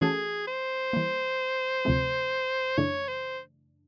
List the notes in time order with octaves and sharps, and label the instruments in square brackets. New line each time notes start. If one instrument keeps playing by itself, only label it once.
[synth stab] E3 A3 C#4 F#4 A4 [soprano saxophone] G#4
[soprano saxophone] C5
[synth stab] E3 G3 A#3
D2 C3 F3 A3 C4
[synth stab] F#2 C#3 E3 A3 D4 [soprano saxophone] C#5
[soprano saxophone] C5